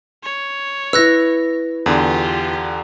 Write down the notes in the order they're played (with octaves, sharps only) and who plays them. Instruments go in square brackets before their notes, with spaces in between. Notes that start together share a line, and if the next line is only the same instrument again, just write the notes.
[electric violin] C#5
[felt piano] E4 B4 [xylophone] E6 F#6 A#6
[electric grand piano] E2 D3 [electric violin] F4 G4